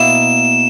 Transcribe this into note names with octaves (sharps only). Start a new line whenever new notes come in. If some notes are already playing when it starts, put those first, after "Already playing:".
Already playing: B2 A#3 E4 E7